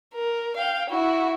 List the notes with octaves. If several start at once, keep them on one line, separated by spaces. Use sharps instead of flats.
A#4
F5 G5
E4 F#4